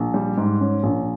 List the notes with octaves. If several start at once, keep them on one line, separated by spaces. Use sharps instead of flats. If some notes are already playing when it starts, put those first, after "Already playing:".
Already playing: A#1
G3
G#2
C#4
A#1